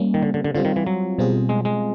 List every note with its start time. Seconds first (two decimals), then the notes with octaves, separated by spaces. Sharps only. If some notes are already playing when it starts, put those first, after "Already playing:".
Already playing: G3 A#3 C#4
0.14 D#3
0.23 D3
0.34 D3
0.44 D3
0.55 D3 G3 C4 F4
0.65 D#3
0.76 E3
0.87 F#3
1.19 B2 G3 C4 F4 G#4
1.49 G#3
1.65 G#3